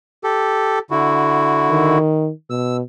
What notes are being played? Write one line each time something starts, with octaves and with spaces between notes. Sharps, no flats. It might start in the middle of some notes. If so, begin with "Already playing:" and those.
G4 A4
D3 E4 F#4
D#3
B2 E6